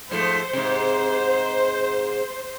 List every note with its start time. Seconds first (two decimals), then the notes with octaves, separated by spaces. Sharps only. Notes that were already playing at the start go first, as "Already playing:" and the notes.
0.11 G#2 F3 A3 C5
0.53 G#2 C3